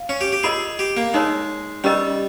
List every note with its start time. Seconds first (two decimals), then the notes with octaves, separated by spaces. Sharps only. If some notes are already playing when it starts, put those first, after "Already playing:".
Already playing: F5
0.09 C#4
0.21 G4
0.32 G4
0.43 F4 G#4 A#4 D#5
0.79 G4
0.97 A#3
1.14 G#3 D#4 A#4 C#5
1.84 G3 C#4 G4 A#4 D#5